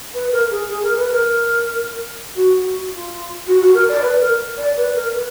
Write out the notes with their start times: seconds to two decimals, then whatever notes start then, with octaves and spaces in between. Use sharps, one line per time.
0.13 B4
0.31 A#4
0.50 G#4
0.68 G#4
0.82 A#4
0.96 B4
1.10 A#4
2.35 F#4
2.91 F4
3.46 F#4
3.60 F#4
3.74 A#4
3.88 D5
4.02 B4
4.20 A#4
4.57 D5
4.76 B4
4.95 A#4
5.13 B4